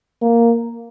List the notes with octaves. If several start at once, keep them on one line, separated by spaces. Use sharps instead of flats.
A#3